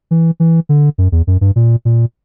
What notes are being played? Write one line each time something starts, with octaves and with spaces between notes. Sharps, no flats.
E3
E3
D3
F#2
E2
F#2
G2
A#2
A#2